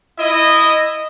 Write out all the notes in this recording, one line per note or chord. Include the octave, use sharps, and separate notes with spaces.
E4 D#5